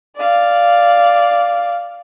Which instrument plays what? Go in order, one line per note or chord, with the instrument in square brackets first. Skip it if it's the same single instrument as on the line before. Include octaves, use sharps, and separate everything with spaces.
[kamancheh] D5 F5